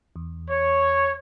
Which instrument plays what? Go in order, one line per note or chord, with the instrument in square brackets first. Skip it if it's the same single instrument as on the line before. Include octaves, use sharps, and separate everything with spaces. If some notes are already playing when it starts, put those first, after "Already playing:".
[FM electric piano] E2
[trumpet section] C#5